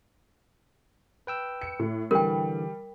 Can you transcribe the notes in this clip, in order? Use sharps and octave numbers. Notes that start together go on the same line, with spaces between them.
B4 G5 E6
C#7
A2
D3 E3 G3 A#4 G5